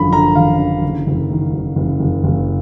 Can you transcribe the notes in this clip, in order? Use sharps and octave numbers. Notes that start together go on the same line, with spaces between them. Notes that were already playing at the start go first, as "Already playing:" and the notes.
Already playing: G#1 F#2 D3 F3 B5
D3 A#5
G#1 F5
D3
F#1
F#1
D#3
F#1
F#1
F#1
F#1